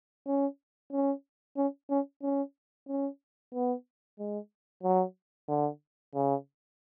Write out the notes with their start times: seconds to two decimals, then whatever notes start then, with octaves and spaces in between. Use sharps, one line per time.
0.27 C#4
0.92 C#4
1.57 C#4
1.90 C#4
2.23 C#4
2.88 C#4
3.54 B3
4.19 G#3
4.83 F#3
5.49 D3
6.15 C#3